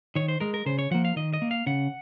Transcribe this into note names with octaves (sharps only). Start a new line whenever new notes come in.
D#3 C#5
C5
G#3 A#4
A#4
C#3 C5
C#5
F3 A#3 F#5
F5
D#3 D#5
D#5
A#3
F5
C#3 F#5